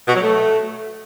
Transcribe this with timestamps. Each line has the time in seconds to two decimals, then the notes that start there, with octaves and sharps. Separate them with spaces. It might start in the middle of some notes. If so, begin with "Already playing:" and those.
0.08 B2
0.15 F#3
0.22 A3